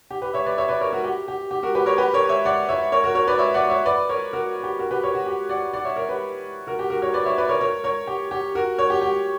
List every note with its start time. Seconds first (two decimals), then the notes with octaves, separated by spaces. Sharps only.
0.11 G4
0.22 G4 B4
0.34 C#5 E5
0.46 B4 D5
0.58 C#5 E5
0.69 B4 D5
0.81 A#4 C#5
0.92 F#4 A#4
1.04 G4
1.28 G4
1.51 G4
1.63 F#4 A#4
1.75 G4 B4
1.86 A#4 C#5
1.98 G4 B4
2.14 A#4 C#5
2.29 C#5 E5
2.45 D5 F#5
2.69 C#5 E5
2.92 A#4 C#5
3.04 F#4 A#4
3.15 A#4 C#5
3.28 B4 D5
3.38 C#5 E5
3.54 D5 F#5
3.70 C#5 E5
3.86 B4 D5
4.09 A#4 C#5
4.33 F#4 A#4
4.63 G4
4.79 F#4 A#4
4.91 G4 B4
5.04 A#4 C#5
5.15 F#4
5.26 G4
5.49 D5 F#5
5.73 D5 F#5
5.85 C#5 E5
5.96 A#4 C#5
6.09 G4 B4
6.67 F#4 A#4
6.79 G4
6.90 F#4 A#4
7.02 A#4 C#5
7.14 B4 D5
7.25 C#5 E5
7.38 B4 D5
7.49 A#4 C#5
7.61 A#4 C#5
7.84 A#4 C#5
8.07 G4
8.31 G4
8.55 F#4 A#4
8.78 A#4 C#5
8.90 G4
9.02 G4